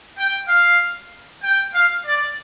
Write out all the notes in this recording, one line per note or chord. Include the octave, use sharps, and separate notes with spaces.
G5
F5
G5
F5
D5